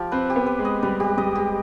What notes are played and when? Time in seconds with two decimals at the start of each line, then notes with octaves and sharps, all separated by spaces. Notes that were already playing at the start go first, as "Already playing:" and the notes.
Already playing: F3 G4
0.12 C4 B4
0.30 G4
0.36 B3
0.47 B4
0.59 G#3
0.65 D#5
0.82 G3 B4
1.00 G#3 G4
1.17 G3 D#5
1.35 G#3 G4